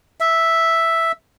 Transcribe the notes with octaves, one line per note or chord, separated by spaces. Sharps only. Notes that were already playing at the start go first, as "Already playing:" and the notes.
E5